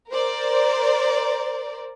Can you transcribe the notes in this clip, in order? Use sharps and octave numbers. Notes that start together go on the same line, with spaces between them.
A#4 C5 D5